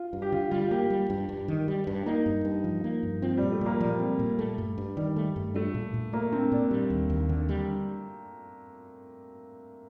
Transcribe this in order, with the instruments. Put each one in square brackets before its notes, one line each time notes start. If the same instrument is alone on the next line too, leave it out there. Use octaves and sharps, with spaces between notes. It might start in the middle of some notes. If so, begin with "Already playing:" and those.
Already playing: [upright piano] F4
[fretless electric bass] G2
[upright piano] G4
[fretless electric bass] D3 [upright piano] F4
[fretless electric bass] G3 [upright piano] F4
[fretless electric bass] A#3 [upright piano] G4
[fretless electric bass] G3
G2
G2
D#3
G3
G2
[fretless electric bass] A#3 [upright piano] D#4
[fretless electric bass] G2
G2
F3
A#3
G2
[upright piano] F3 [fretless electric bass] C4
[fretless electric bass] A#2 [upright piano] G3
[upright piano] A3
[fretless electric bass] A#2 [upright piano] A#3
[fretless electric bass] F3 [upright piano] G3
[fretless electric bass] C4
A#2
A3
G2
G2
[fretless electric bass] D#3 [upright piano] G3
[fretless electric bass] A3
G2
[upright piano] A3 [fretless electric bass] D4
[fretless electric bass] A#2
A#2
[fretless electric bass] A3 [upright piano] A#3
[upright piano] C4 [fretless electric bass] D4
[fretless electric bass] A#2 [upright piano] D4
[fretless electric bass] G3
D#2
D#2
D3
G3